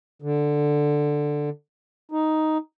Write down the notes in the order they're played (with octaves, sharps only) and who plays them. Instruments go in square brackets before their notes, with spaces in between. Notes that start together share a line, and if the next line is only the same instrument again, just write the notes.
[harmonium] D3
D#4